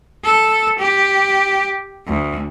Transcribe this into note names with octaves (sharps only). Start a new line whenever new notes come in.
A4
G4
D2